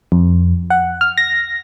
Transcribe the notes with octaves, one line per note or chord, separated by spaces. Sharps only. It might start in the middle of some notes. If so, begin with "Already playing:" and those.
F2
F#5
F6
A#6